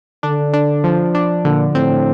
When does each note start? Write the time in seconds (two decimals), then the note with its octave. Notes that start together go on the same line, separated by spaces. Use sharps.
0.23 D3 D4
0.53 D4
0.84 F3
1.15 D4
1.45 A#2 D3
1.74 A2 C4